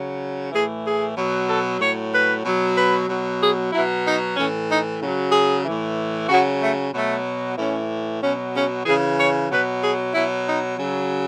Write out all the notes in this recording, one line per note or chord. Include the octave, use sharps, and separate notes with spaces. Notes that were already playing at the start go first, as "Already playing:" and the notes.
Already playing: C#3 F#3
A2 E3 G#4
G#4
B2 F#3
A4
A2 F#3 C#5
B4
B2 F#3
B4
B2 F#3
G#4
B2 F#3 E4
D#4
A2 E3 C#4
D#4
C#3 F#3
G#4
A2 E3
C#3 F#3 F#4
A3
B2 F#3 A3
A2 E3 C#4
B2 F#3 C#4
C#4
C#3 E3 G#4
C#5
B2 F#3 B4
G#4
B2 F#3 E4
D#4
C#3 F#3